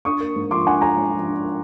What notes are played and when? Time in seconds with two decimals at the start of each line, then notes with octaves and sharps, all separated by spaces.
0.05 D4 C#6 D#6
0.20 A#3
0.36 G#2
0.51 F3 C6 D6
0.66 D4 F#5 G#5
0.81 A#3 G#5 A#5
0.97 G#2
1.12 F3
1.27 D4
1.43 A#3